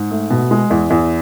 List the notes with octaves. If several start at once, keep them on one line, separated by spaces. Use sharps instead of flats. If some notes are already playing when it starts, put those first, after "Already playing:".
Already playing: G#2
A3
B2
G#3
E2
E2